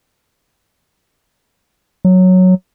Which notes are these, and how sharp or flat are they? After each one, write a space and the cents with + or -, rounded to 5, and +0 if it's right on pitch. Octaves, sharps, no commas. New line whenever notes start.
F#3 -5